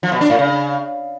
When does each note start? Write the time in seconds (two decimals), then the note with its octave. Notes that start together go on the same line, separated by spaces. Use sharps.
0.03 F3
0.12 B2
0.21 D4
0.30 A2
0.39 C#3